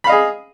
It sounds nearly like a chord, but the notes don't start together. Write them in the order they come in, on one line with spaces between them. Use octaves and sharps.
B5 F5 D#5 G#4